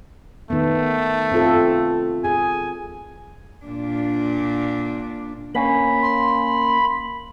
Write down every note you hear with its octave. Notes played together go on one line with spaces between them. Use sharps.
D#3 A3 B3
C4 F4 A4
G#4 G#5
A#2 D4
A#3 C#4 B5
C6